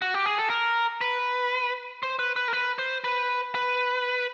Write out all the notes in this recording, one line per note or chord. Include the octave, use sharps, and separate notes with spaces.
F#4
G4
G#4
A4
A#4
B4
C5
B4
B4
A#4
B4
C5
B4
B4